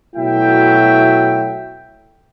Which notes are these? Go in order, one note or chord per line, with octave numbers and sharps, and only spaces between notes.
B2 F#3 A3 E4 E5 G5